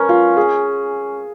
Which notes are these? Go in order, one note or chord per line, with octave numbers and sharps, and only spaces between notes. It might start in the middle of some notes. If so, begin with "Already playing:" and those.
Already playing: C#4 A#4 B4
F4
G#4